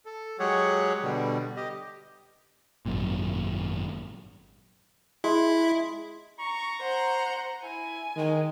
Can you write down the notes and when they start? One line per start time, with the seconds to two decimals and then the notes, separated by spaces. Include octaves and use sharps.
0.06 A4
0.39 F#3 G#3 G4 G#4 C#5 F#5
1.02 B2 D3 G3
1.56 G4 D#5
2.86 G#1 F#2 A#2
5.24 G#3 E4
6.40 A#5 C#6
6.80 C5 F#5
7.63 E4 G#5
8.16 D#3 G#3